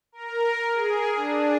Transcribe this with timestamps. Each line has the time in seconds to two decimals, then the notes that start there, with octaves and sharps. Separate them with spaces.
0.12 A#4
0.72 G#4
1.16 D4